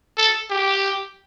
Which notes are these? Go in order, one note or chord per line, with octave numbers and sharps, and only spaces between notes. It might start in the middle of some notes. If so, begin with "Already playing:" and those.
A4
G4